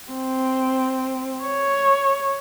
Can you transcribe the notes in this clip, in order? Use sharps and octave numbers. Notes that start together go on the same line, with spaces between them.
C4
C#5